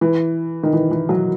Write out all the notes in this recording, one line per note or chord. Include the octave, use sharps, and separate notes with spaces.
E3
D#3
E3
E3
F#3